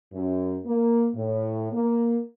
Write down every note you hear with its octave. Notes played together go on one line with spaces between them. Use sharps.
F#2
A#3
A2
A#3